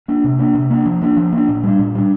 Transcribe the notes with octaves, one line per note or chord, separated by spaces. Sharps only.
A#3 D4
C3
A#3 D4
C3
A#3 D4
F3
A#3 D4
F3
A#3 D4
A#2
G3 D4
A#2
G3 D4